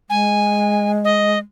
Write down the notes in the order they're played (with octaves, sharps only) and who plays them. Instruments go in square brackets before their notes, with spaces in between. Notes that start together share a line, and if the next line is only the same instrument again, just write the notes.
[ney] G#3 [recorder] G#5
[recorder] D#5